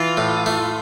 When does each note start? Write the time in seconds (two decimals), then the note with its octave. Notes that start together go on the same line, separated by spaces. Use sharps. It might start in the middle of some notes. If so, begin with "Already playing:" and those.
Already playing: E3 F4
0.17 A2
0.46 A3